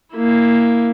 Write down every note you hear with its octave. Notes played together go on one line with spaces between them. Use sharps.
A#3 E4